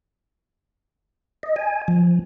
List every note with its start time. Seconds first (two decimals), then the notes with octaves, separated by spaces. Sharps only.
1.43 D#5
1.56 G#5
1.88 F3